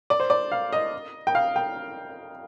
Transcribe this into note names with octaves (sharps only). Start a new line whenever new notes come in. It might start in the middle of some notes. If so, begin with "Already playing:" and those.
D5
C5
D5
F5
D#5
G5
F5
G5